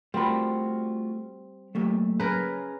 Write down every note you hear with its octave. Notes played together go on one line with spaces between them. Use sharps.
G3 A3 C4 F4 F#4 A#4 B5
F#3 A3 A#3 G4
C#4 G#4 A#4 B4